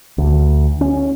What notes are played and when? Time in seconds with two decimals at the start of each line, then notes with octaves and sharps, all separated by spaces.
0.18 D2
0.81 C#4